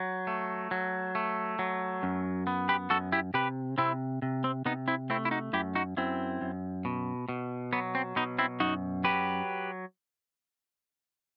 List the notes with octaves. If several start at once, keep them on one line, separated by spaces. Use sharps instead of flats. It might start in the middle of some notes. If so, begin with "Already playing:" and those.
Already playing: F#3
A3
F#3
A3
F#3
F#2
B3
G4 B4
F#2 F#4 A4
E4 G4
C3 G4 B4
C3 C4 E4
C3
C4
C3 B3 D#4
C4 E4
A3 C4 E4
E4
D#4 F#4
F#2 E4 G4
D#4 F#4
F#2 C4 E4
F#2
B2
B2
F#3 B3
C4
B2 B3 D#4
C4 E4
F#2 D#4 F#4
F#3 G4 B4